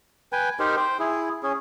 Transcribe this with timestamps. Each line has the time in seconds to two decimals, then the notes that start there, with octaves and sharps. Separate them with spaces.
0.33 B4 G5 G#5
0.59 D#4 G4 A#4 C5
0.77 C5 G5
0.99 E4 G#4
1.43 C#4 G#4